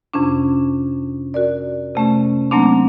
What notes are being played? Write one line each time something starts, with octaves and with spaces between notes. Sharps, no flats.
F2 C3 C#4 D4
F#4 A#4 D5
C3 A3 C#4
F#3 A3 A#3 C4 D4